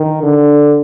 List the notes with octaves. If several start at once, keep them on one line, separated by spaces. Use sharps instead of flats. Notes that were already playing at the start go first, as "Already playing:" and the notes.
Already playing: D#3
D3